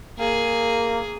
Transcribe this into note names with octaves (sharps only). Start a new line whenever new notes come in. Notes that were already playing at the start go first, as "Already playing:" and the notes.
A#3 G#4